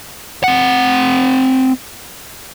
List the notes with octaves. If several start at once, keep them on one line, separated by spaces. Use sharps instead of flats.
C4 F#5